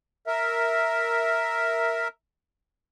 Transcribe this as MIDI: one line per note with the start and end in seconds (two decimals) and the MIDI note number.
0.27 2.08 70
0.27 2.08 76